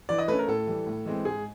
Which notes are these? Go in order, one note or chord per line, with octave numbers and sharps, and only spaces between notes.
E3 D5
D#5
A3 C#4 B4
A#4
A2 A4
E3 G3
A2
E3 G#3 C4
G#2 G#4